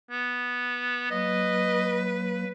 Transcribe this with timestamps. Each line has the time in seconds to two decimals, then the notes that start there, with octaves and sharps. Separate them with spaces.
0.11 B3
1.11 F#3 A#3 B4 D#5